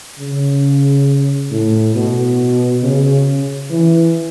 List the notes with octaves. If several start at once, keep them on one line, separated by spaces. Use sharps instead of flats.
C#3
A2
B2
C#3
E3